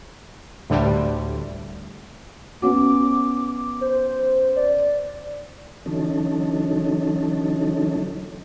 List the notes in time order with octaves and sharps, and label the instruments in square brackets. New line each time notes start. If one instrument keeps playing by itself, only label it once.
[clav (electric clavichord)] D2 [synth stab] A2 D3 G3
[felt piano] B3 C#4 F#4 [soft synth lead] D6
[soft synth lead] C5
D5
[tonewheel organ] D3 E3 F#3 C#4 D#4 A4